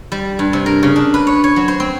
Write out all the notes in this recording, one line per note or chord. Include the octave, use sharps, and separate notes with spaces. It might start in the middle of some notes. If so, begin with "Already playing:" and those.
G3
G2
C3
A#4
C#3
D4
B4
C#5
C#5
F#3
C5
C4